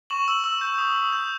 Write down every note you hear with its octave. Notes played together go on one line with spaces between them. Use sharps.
C#6 E7 F#7
E6
E6
G6
D#6
D#6
G6